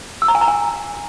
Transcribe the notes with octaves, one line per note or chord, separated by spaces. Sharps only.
E6
A#5
G#5
A#5
G#5